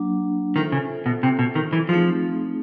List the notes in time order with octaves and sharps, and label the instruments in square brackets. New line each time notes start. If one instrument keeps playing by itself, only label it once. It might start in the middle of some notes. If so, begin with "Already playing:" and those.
Already playing: [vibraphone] F#3 A#3 D4
[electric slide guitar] D#3 [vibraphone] F4 A4 C5 E5
[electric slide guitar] C#3
B2
C3
B2
D#3
E3
[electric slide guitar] F3 [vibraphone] A3 C4 D#4 G#4